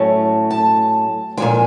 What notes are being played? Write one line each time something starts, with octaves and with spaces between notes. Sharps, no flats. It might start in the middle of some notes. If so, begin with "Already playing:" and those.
Already playing: A2 F#3 A3 C#4 A5
A5
A#2 F3 G#3 G#5